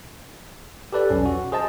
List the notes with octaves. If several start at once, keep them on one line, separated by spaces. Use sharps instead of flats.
G4 A4 B4 D5
B1 E2 C#4
F#4
G#4 C5 D#5 A5